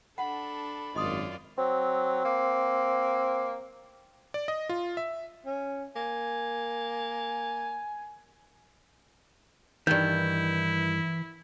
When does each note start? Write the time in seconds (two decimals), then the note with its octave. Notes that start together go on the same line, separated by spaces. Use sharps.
0.18 D4 A4 F#5 B5
0.96 G#1 F#2 F4 D5 D#5 C6 D#6
1.58 F#3 C4
2.25 A#3
4.34 D5
4.48 D#5
4.69 F4
4.97 E5
5.46 C#4
5.96 A#3 G#5
9.87 G2 D#3 E3 E4 G6